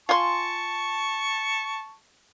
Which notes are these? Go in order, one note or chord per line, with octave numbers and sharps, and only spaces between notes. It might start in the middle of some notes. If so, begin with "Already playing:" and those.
F4 G#5 A5 C6 C#6